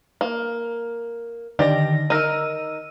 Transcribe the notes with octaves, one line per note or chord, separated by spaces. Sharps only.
A#3
D3 D#3 G4 D5 A#6
D#4 A#4 E6 D#7